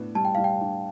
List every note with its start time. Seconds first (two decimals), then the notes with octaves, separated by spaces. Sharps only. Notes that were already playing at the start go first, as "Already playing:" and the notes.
Already playing: A2 B3 D4
0.15 G3 A5
0.25 G5
0.35 G3 F5
0.44 G5
0.61 D4